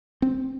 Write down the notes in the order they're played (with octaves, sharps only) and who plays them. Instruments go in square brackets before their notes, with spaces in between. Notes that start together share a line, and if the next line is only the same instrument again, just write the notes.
[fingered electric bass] C4